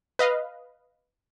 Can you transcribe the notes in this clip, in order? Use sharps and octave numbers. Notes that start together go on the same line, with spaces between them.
B4 D#5 F5